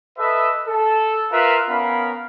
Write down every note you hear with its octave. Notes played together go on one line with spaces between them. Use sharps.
A4 B4 D#5 E5
A4
F4 A#4 B4 E5 F5
B3 C#4 A#4 F5 B5